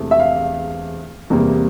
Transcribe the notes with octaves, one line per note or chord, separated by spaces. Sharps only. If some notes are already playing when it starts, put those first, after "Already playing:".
Already playing: E1 E2 C3 E3 A3
E5
F5
E2 C3 G3 A#3